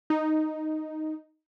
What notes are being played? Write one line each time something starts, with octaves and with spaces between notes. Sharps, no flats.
D#4